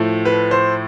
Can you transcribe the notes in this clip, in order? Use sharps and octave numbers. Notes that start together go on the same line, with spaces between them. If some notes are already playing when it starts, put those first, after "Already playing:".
Already playing: A2 F3 A3
B4
C5